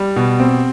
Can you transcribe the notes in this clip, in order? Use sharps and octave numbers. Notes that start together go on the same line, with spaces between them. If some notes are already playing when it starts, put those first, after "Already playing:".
Already playing: G3
B2
C4